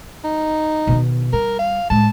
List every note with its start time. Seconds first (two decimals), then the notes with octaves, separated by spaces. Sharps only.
0.24 D#4
0.87 B2 D#3
1.33 G3 A#4
1.59 F5
1.90 A2 G#3 A5